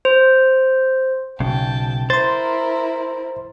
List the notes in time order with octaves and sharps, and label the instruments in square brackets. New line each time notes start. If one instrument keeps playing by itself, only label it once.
[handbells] C5
[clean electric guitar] B1 C#3 [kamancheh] G5 A5
[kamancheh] E4 A#4 [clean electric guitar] C5 [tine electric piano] C6 A6